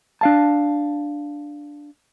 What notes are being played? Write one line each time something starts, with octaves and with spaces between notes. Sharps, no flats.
D4 F5 A5